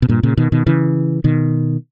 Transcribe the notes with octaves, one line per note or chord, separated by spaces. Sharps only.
B2
G2 A#2
A#2 C#3
B2 D#3
B2 D#3
C#3 E3
B2 D#3